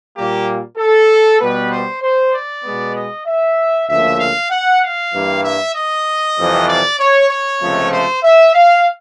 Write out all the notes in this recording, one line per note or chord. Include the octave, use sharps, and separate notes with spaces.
A#2 G3 A#3 G4
A4
B2 G3 B3 B4
C5
C5
D5
B2 G#3 B3
D#5
E5
D2 C#3 F3 A#3 E5
F5
F#5
F5
G2 E3 G3 A#3
E5
D#5
F2 C3 E3 G3
D5
C#5
C#5
C#2 C3 F3 A3
C5
E5
F5